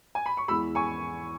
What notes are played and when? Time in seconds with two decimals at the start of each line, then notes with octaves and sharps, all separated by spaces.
0.15 G#5
0.26 B5
0.37 C#6
0.48 E2 E3 G#3 B5 E6
0.75 G#5 C#6